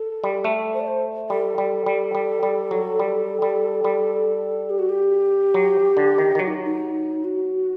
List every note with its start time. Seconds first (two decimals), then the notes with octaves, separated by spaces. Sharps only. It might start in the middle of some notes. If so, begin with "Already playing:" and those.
Already playing: A4
0.24 G3
0.44 A3
0.74 C5
0.80 D5
0.87 C5
1.30 G3 A4
1.58 G3
1.86 G3
2.15 G3
2.43 G3
2.71 F#3
2.99 G3
3.42 G3
3.84 G3
4.70 G4
4.79 F#4
4.89 G4
5.54 F#3
5.97 D3
6.18 D#3
6.35 D#3
6.39 F#3 F#4
6.48 D#4
6.64 D#4
7.24 F#4